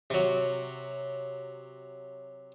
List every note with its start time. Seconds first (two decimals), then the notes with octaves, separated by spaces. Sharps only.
0.10 C3 F#3